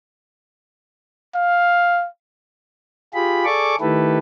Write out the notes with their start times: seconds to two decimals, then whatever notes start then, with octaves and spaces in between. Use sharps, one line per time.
1.35 F5
3.14 F4 G4 G#4 B5
3.45 G#4 A4 D5 C#6 D6
3.81 D#3 A3 E4 G4 A4 B4